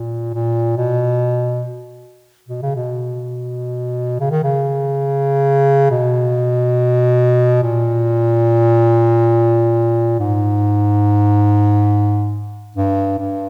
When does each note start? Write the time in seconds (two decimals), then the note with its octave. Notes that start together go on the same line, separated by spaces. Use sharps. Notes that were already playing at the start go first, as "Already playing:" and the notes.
Already playing: A#2
0.34 A#2
0.76 B2
2.48 B2
2.62 C#3
2.75 B2
4.20 C#3
4.31 D#3
4.43 C#3
5.91 B2
7.63 A#2
10.19 G#2
12.76 G2
13.19 G2